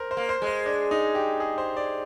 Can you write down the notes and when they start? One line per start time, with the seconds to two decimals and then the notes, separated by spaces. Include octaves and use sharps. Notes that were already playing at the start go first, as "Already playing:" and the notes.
Already playing: A#4 C5
0.11 C5
0.17 A#3
0.29 C5
0.42 G#3
0.47 C5
0.66 D4
0.91 D#4
1.15 G4
1.40 G#4
1.58 C5
1.77 D5